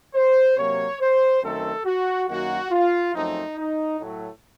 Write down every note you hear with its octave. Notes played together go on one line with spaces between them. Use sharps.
C5
C3 F#3 A#3 C#5
C5
F#2 D#3 A3 C4 A4
F#4
F#2 D#3 A#3 F#4
F4
F#2 F3 A3 C4 D#4
D#4
A2 F#3 A3